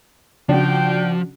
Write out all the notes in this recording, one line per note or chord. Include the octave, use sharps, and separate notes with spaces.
C#3 F3 D4 F#4 G5